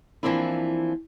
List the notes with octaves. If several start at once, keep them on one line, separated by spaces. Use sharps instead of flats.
E3 F3 A#3 C4 D4 E4